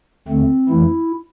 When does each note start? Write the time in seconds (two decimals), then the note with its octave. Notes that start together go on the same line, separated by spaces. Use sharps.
0.28 D2 D3 A3 C4
0.69 F2 E3 A3 E4